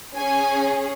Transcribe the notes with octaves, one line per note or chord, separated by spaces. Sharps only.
C#4 G#4 G#5